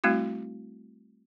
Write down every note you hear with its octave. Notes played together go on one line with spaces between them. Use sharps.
G3 A3 C4 E4 F#4